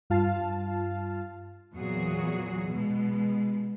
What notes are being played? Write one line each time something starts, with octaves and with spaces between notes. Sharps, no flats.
G2 F4 F5 A5
E2 A#2 F#3 F#4 G#4
B2 G#3